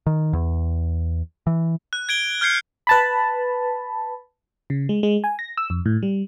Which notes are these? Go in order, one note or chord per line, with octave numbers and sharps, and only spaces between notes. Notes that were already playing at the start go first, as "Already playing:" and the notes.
D#3
E2
E3
F#6
G#6 D7 G7
F6 G6 G#6 C7 C#7
B4 A5 B5
C#3
G#3
G#3
G#5
A#6
E6
F2
A2
G3